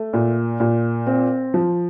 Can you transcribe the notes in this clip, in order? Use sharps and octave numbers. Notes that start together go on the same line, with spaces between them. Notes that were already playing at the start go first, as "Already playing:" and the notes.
Already playing: A3
A#2
A#2
C4
F3